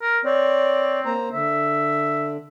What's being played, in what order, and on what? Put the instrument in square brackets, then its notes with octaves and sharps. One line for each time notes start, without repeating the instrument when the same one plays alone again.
[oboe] A#4
[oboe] C4 [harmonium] C#5 D5
[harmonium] A#3 C5 A#5
[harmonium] D3 [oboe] E5